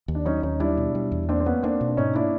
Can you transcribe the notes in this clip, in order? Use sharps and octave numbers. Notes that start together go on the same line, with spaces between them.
D#2
D4
F#3 C#4 D#4
D#2 C#4 D#4
G3 D4 E4
B2
G3
E2
A#3 C4 D4
C4
A#3 B3 C#4
A#3 C4 D4
B2
D4
G#2 C#4 D#4
A#3 D4 E4